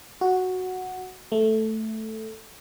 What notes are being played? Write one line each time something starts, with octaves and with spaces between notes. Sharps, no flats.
F#4
A3